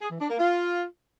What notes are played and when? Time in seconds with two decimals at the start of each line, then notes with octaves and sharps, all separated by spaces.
0.01 G#4
0.11 E3
0.20 D4
0.29 A#3
0.39 F4